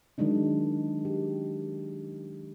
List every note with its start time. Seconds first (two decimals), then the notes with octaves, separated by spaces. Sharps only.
0.18 D#3 F#3 G#3 D4 D#4
1.05 G4